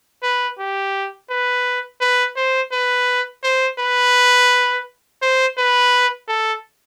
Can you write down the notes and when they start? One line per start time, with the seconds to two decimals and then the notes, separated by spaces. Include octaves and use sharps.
0.23 B4
0.59 G4
1.30 B4
2.01 B4
2.36 C5
2.72 B4
3.43 C5
3.79 B4
5.22 C5
5.57 B4
6.28 A4